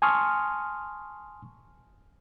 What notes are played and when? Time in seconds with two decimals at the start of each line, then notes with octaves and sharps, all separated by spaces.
0.02 G#5 A5 C6 C#6 D#6 F6